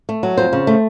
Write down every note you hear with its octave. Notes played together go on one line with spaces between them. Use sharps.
A3
F#3
F2 C5
C#3
A3